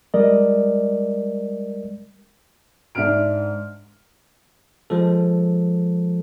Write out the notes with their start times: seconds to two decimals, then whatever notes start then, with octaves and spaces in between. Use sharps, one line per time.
0.14 G3 G#3 A#4 D5 D#5
2.95 G#2 D4 E5 F6 D7
4.90 F3 G#3 A4